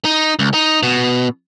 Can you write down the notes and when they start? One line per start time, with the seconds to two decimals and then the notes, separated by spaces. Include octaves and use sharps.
0.05 D#4
0.39 C#2
0.54 D#4
0.83 B2